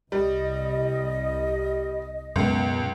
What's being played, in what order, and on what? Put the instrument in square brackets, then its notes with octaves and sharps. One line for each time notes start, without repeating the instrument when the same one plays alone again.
[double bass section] C2 [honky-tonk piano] G3 [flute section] D#5
[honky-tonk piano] C#2 [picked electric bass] F#2 B2